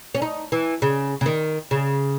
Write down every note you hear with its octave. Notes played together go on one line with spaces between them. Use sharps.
C#4
D#4
E3
C#3
C#3
D#3
C#3